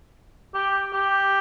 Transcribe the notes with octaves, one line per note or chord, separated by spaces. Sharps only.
G4
G4